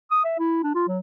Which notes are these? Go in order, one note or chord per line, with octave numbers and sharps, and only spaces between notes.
D#6
E5
E4
D4
F4
F#3